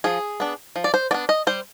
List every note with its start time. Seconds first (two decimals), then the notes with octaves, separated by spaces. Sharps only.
0.04 F3 G#4
0.40 B3 D4
0.76 F3
0.84 D5
0.94 C5
1.11 B3 D4 D5
1.29 D#5
1.47 G3 C5